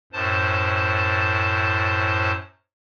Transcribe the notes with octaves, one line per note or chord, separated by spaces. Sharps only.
F#2 A2 C5 A5